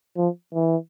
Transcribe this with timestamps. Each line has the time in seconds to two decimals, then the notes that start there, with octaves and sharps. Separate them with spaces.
0.17 F3
0.54 E3